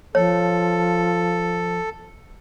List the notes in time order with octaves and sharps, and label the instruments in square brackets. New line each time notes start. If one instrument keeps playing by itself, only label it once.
[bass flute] F3 [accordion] A4 [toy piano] C#5